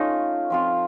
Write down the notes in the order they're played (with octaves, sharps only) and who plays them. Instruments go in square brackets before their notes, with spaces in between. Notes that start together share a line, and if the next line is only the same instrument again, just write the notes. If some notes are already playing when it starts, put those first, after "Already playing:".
Already playing: [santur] A3 C#4 F4 [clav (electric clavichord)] D#4
[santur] F3 C4 F4